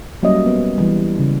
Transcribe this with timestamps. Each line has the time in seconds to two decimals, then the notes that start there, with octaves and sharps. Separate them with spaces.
0.23 F#3 G3 A#3 C#4 D#5 E5
0.46 B3
0.78 E3 G3
1.19 C#3